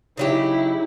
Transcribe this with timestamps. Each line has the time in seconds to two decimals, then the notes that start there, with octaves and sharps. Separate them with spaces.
0.17 C#3 F#3 D#4 E4 G4